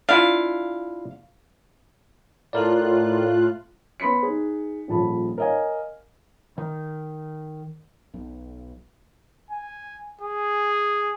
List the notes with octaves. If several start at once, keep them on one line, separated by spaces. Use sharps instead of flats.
D4 E4 F4 F5
A2 F4 A4 A#4 D5 F#6
B3 B5 C6 B6 C#7
D#4 G#4
D#1 A#1 A5 B5
A#4 C#5 D#5 F5 G#5
D#3
B1
G#5
G#4